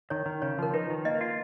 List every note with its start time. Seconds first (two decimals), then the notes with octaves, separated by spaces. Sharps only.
0.10 D#3 C#5
0.26 D#3
0.42 C#3 C#5
0.58 F3 A#4
0.74 D#4 B4
0.90 D#3
1.05 A#3 D#5
1.21 F4